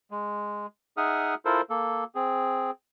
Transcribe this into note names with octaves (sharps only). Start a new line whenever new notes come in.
G#3
D#4 G#4 E5 F#5 D#6 F6
E4 F4 A4 A#4 C5
A#3 A4
C4 G#4